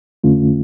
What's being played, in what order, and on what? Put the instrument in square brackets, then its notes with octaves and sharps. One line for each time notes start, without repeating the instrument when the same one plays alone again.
[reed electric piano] F2 D3 A3 C#4 F4